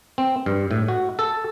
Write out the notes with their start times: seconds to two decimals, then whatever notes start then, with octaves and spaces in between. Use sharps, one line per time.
0.18 C4
0.46 G2
0.71 A2
0.88 F#4
1.19 A4